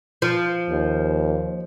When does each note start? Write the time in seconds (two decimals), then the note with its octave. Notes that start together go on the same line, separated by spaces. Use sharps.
0.22 F3
0.69 D#2